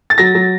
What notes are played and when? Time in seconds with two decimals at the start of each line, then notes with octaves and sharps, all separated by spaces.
0.10 A6
0.18 F#3 A#6
0.35 F#3